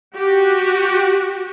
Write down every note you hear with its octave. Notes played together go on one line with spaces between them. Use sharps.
F#4 G4